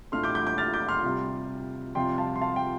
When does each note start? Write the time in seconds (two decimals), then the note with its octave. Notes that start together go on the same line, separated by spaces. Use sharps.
0.12 A2 A3 D4 F4 C6 F6
0.23 D6 G6
0.35 D6 G6
0.47 D6 G6
0.58 F6 A6
0.74 D6 G6
0.88 C6 F6
1.04 C3 G3 F4
1.95 F2 C3 G3 F4 G5 C6
2.18 F5 A5
2.35 C6
2.41 F5 A5
2.56 G5